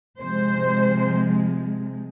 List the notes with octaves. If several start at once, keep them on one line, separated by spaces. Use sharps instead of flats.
C3 F3 G#3 C5